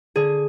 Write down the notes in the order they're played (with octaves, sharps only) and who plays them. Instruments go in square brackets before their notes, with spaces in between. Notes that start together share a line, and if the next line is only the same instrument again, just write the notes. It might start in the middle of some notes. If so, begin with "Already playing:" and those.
[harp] D3 G#4